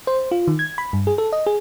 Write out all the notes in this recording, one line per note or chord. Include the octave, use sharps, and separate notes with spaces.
C5
F4
D#3
G#6
B5
G2
G#4
A4
D#5
G#4